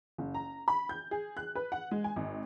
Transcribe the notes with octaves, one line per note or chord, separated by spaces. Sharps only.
F#1
A#5
B5
G6
G#4
F#6
B4
F#5
G#3
G#5
G#1